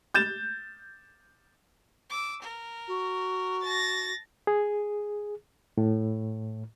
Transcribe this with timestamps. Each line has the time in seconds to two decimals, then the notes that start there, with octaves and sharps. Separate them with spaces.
0.14 G6 A6 E7
2.10 D6 E6
2.42 A#4
2.88 F#4
3.64 A5 A6 A#6
4.47 G#4
5.78 A2